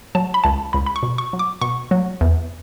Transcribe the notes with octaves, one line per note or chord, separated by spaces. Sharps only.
F#3 A5
B5
C#2 A5
C#2 B5
B5
C#6
B2
C#6
F#3
D6
B2 C#6
F#3
E2